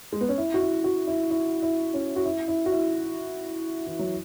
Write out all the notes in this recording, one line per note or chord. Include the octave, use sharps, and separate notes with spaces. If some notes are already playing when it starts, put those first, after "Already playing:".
G#3
B3
C#4
E4
F#4
E4
F#4
E4
E4
E4
C#4
F#4
E4
E4
F#4
E4
E3
F#3